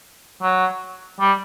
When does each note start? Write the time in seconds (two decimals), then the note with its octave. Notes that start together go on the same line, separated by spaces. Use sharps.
0.42 F#3
1.20 G3